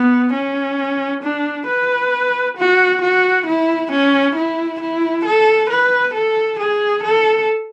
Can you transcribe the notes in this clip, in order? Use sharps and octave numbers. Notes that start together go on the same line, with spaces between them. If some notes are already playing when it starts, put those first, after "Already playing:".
Already playing: B3
C#4
D4
B4
F#4
F#4
E4
C#4
E4
E4
A4
B4
A4
G#4
A4